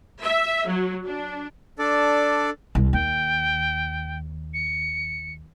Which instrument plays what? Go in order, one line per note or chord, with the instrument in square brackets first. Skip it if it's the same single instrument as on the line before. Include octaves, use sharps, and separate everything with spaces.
[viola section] E5
F#3
D4
[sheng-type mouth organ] D4 A4 D5
[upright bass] C2
[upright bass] D#2 [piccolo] G5
[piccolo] C#7